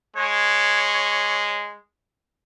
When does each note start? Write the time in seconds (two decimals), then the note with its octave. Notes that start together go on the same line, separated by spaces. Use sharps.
0.16 G#3 C#5